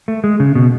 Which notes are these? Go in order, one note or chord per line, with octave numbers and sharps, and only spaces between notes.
A3
G#3
C#3
B2